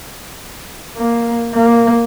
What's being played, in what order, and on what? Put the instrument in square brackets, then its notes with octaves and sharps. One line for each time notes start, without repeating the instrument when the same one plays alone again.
[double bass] A#3
A#3